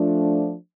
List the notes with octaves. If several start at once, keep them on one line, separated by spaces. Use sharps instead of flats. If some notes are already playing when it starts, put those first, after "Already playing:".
Already playing: F3 A3 D4